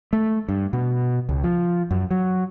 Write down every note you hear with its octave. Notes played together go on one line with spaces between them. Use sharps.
A3
G2
B2
C#2
F3
F#2
F#3